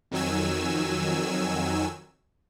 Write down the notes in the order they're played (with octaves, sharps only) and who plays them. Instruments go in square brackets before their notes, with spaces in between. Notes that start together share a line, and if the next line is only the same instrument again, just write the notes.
[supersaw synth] F2 D#3 F#3 G#5 E6